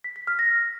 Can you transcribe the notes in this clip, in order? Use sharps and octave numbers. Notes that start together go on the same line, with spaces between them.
B6
B6
F6
A#6